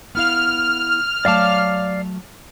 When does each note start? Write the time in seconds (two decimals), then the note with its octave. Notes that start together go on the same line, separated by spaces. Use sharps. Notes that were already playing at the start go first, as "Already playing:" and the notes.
0.15 B3 E4 F5 F6
1.25 F#3 A3 D5 F5 A5 D6